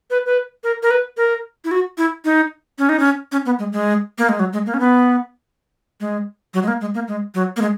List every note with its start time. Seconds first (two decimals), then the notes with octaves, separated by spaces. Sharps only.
0.11 B4
0.26 B4
0.64 A#4
0.83 A#4
0.91 B4
1.17 A#4
1.65 E4
1.71 F#4
1.98 E4
2.25 D#4
2.79 C#4
2.89 D#4
3.00 C#4
3.32 C#4
3.45 B3
3.59 G#3
3.73 G#3
4.18 A#3
4.29 G#3
4.39 F#3
4.53 G#3
4.66 A#3
4.74 C#4
4.80 B3
6.00 G#3
6.54 F#3
6.63 G#3
6.68 A#3
6.81 G#3
6.95 A#3
7.08 G#3
7.35 F#3
7.56 A#3
7.61 G#3